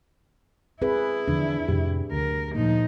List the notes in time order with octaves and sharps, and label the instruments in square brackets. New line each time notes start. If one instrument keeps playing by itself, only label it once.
[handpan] C4 G#4 B4 [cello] E4
[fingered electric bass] E2 D3 F3 [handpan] D4
[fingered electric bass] F2 A2 C3 [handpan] G4
[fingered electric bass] D2 [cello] A#4
[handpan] A#2 A#3 [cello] F3 D#4